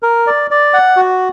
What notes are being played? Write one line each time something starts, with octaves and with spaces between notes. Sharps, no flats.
A#4
D5
D5
F#5
F#4